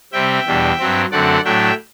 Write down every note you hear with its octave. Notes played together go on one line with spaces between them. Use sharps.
C3 G3 C4 E5 G5
E2 B2 G3 D4
G2 F#3 C4
F#2 D3 A3 C4 D5 F#5
A2 F#3 A3 D4 E5 G5